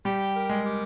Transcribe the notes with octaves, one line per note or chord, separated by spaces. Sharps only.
G3 G4
A#4
G#3
G4